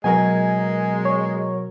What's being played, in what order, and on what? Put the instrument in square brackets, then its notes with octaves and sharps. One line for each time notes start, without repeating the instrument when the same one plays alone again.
[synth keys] B2 F#3 A#4 [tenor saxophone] G#3 [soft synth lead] G#5
[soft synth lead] C#5